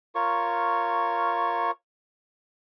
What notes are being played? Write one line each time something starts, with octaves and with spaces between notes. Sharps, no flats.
F4 A#4 C#5 C#6